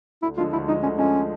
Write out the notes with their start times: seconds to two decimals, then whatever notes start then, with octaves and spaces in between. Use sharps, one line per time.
0.23 D2 E4
0.37 D3 F3 G#3 F4
0.53 D2 E4
0.68 D3 F3 G#3 D#4
0.83 D2 C#4
0.98 D3 F3 G#3 C#4